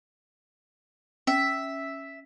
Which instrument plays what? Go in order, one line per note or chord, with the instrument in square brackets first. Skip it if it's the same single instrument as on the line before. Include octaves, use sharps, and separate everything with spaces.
[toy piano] C#4 [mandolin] E5